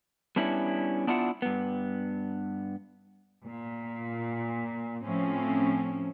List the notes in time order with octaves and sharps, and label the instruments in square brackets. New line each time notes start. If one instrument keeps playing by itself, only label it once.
[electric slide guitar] G3 B3 C#4 D4 E4
B3 D4 E4 F4 F#5
G2 B3
[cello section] A#2
A2 F3 C4 C#4